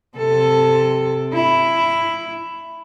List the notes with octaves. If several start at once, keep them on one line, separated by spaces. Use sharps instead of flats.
C3 A4
E4